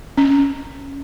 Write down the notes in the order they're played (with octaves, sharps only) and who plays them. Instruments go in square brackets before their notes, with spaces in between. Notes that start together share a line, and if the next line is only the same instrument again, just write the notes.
[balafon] C#4